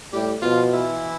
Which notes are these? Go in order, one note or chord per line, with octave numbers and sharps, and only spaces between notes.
A2 G3 G4
B2 F3 F4
E3 E4